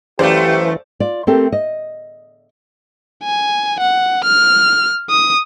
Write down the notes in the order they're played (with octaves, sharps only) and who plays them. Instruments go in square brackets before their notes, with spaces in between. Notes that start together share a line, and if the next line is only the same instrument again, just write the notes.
[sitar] F#2 A3 [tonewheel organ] E3 [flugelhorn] G4 [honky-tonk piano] C5 D5 F5
[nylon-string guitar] F4 D5
A3 C4 G4 A4 A#4
D#5
[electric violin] G#5
F#5
F6
D#6